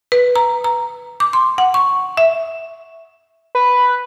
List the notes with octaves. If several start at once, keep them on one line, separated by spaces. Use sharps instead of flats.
B4
A#5
A#5
D6
C6
F#5
C#6
E5
B4